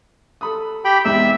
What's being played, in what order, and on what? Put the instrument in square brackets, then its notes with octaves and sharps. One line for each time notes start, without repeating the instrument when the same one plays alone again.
[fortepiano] A4 B5 D#6
[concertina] G4 G5 B5
[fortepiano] E2 G#2 C3 [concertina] E5 E6